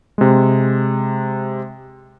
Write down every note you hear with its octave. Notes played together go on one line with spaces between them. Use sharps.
C3 G#3